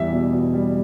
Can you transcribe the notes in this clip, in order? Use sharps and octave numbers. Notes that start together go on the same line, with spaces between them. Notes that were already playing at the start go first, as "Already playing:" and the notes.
Already playing: E2 G3 E5
B2
B2
G3